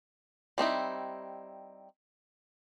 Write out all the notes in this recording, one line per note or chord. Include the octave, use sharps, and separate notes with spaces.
G3 C4 D#4 E4